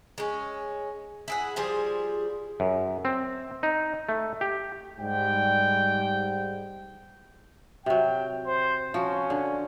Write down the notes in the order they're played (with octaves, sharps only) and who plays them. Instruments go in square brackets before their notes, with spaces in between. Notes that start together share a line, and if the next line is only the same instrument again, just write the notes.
[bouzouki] G#3 C#4
E4 G#4 F#5
F3 G3 G#4 C5
[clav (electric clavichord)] F#2
C4
D#4
A3
G4
[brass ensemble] G#2 G3 G5
[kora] C3 F#3 [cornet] G5
[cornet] C5
[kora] F3 F#4 [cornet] C#4
[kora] D3